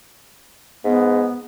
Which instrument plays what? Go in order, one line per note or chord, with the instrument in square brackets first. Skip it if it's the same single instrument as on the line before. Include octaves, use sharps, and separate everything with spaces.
[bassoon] G#2 [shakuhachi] B3